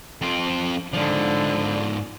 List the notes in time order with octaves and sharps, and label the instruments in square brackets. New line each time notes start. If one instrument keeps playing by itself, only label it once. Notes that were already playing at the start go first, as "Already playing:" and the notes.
[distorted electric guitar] F2 C4
[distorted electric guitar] G#2 F3 [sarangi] D3